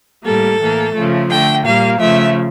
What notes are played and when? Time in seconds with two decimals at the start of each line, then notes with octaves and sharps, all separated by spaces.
0.25 A2 G3 A#3 A4
0.60 A2 E3 A#3
0.95 C#3 F3 A3
1.30 D3 A3 G5
1.65 A#2 G3 A#3 F5
2.00 C#3 F3 A3 E5